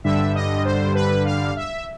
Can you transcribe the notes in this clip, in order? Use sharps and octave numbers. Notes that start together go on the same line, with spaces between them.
G2 D3 G3 E5
D#5
C5
B4
F5
E5